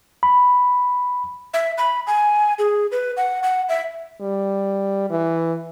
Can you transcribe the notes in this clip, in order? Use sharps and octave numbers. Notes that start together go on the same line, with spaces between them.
B5
E5
B5
G#5
G#4
B4
F#5
F#5
E5
G3
E3